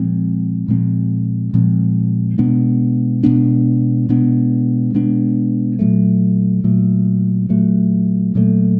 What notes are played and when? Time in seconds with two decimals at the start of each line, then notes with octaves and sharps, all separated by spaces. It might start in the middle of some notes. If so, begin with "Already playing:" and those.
Already playing: A#2 F3 G#3 C4
0.68 A#2 F3 G#3 C4
1.54 A#2 F3 G#3 C4
2.38 B2 G#3 B3 D4
3.23 B2 G#3 B3 D4
4.09 B2 G#3 B3 D4
4.94 B2 G#3 B3 D4
5.79 A#2 F#3 A3
6.64 A#2 F#3 A3
7.49 A#2 F#3 A3
8.35 A#2 F#3 A3